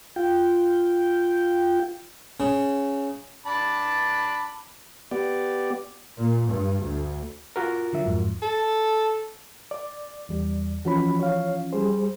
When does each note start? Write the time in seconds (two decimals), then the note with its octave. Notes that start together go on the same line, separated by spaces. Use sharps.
0.16 F4 G5
2.40 C#3
3.46 D4 A5 B5
5.11 B3 G4 D5
6.18 A#2
6.49 G2
6.82 D2
7.56 F4 F#4 A#4
7.93 D3 F#3 E5
8.06 F2 G#2
8.42 A4
9.71 D5
10.29 E2 G3
10.85 E3 F3 C#4 F#4 B5
11.19 C#5 F5
11.73 G3 G#4 C5